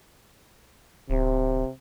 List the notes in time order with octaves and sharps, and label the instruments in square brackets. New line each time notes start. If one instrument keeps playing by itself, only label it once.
[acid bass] D1 [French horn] C3